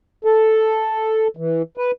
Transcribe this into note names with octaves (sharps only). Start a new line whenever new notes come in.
A4
E3
B4